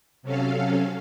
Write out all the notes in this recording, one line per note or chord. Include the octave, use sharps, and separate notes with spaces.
C3 F#3 C#4 A4 F5